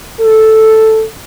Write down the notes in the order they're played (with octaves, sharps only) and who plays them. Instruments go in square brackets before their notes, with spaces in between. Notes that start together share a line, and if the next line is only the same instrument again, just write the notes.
[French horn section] A4